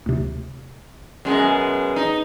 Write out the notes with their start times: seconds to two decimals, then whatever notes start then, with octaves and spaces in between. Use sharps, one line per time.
0.06 D2 C3
1.25 F#2 B2 G#3
1.96 D#4